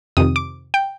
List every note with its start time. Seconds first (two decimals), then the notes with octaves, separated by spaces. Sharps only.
0.17 F2 C3 D#3 D#6
0.36 D6
0.74 G5